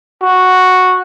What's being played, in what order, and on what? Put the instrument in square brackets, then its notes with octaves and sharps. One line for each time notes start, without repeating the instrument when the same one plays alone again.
[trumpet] F#4